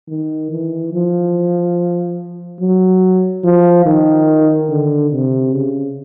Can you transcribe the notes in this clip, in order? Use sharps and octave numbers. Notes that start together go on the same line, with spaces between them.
D#3
E3
F3
F#3
F3
D#3
D3
C3
C#3